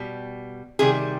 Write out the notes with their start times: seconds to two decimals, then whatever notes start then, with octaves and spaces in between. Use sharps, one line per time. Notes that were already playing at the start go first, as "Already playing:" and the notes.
Already playing: B2 G3
0.79 C3 D#3 G3 G#4